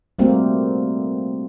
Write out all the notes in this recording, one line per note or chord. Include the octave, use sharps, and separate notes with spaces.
G3 A3 A#3 C4 F#4